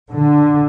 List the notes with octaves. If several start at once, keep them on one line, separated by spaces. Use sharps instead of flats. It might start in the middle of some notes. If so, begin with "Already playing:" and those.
D3